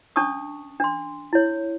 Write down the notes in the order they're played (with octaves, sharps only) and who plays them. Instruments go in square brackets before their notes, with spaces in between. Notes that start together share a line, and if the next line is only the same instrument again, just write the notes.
[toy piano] C#4 D4 A5 C#6 D#6
D4 C6
E4 C#5